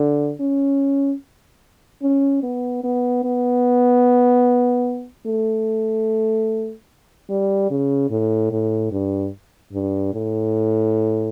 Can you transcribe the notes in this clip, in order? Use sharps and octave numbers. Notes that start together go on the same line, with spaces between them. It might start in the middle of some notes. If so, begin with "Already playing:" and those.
Already playing: D3
C#4
C#4
B3
B3
B3
A3
G3
C#3
A2
A2
G2
G2
A2